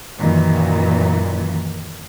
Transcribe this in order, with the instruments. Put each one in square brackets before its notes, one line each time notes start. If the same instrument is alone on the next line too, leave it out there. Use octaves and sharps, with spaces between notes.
[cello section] F#2 A#2 D#3 E3